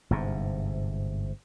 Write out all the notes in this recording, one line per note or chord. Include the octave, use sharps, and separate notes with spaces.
G1 G#2 C3